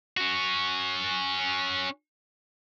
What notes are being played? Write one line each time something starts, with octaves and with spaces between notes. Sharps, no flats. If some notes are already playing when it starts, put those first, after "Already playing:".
C#4 F#4